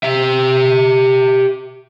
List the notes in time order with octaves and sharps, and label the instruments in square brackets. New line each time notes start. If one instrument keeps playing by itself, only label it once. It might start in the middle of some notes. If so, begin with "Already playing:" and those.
[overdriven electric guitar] G4 E5